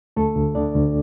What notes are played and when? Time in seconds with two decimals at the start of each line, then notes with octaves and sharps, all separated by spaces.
0.16 D2 A3 A4
0.36 D2
0.55 D3 D4 D5
0.75 D2